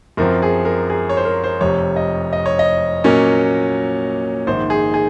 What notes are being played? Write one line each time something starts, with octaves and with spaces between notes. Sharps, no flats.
F#2 F3 C4 A#4
G#4
A#4
G#4
C#5
C5
A#4
C5
F1 F2 C3 C#5
D#5
D#5
C#5
D#5
A#2 F#3 A#3 C#4
A#1 G#2 D#3 C5
G#4
G#4